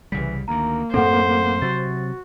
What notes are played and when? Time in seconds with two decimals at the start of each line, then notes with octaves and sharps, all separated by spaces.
0.12 C2 C#3 E3 G3 B6
0.48 D2 D#3 A#3 A#5
0.94 F#2 A2 C4 A4 C5 F#5
1.62 C3 F#3 F#4 A6